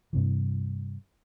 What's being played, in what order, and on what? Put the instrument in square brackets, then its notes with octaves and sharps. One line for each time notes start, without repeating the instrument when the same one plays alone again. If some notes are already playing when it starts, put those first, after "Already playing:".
[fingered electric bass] G2 C3 E3